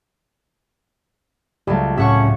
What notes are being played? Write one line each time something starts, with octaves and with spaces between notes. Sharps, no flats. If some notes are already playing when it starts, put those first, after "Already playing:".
C#2 F#3 G3 A3
A2 A3 C4 C#4 G4 E5 F#5 C#6